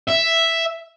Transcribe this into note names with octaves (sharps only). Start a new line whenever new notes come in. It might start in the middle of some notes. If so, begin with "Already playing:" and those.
E5